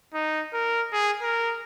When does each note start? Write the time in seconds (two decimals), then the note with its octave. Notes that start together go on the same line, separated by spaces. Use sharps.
0.14 D#4
0.53 A#4
0.93 G#4
1.22 A#4